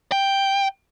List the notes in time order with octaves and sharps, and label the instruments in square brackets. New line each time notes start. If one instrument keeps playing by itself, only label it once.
[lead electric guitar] G5